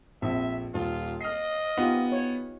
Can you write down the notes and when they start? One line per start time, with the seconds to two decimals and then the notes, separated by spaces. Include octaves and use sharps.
0.22 A#1 F2 E5
0.74 D#1 F4
1.21 D#5 F6 C7
1.77 B3 D#4 F4 G4
2.12 C#5